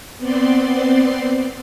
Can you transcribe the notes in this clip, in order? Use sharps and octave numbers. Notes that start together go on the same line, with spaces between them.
B3 C4 D5 C6